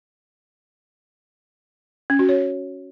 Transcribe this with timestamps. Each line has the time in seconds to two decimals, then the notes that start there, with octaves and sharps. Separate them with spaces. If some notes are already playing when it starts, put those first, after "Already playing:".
2.10 C#4
2.19 F#4
2.29 C#5